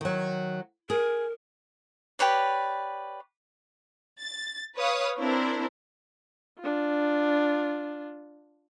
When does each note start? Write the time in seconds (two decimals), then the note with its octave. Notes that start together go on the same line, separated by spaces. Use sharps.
0.01 D#3 F#3
0.90 G#4 A#4
2.19 G4 B4 C#5 D5
4.19 A6
4.77 B4 C#5 F5 D#6
5.19 C4 D4 E4 A#4 C5
6.60 D4 F4